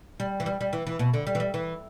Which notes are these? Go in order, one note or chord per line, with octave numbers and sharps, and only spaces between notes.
G3
E3
G3
G3
E3
E3
B2
D3
G3
E3
G3
E3